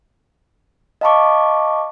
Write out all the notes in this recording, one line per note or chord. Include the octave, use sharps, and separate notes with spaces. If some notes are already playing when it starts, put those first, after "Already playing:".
D#5 F5 A5 B5 C#6 D6